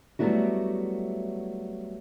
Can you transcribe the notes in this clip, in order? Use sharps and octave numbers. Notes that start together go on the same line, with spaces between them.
F#3 G3 A3 B3 E4 F#4